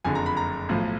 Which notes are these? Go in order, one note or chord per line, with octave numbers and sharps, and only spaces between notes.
F#1 F2 D3 G#5
A#5
B5
A#5
B1 A2 F3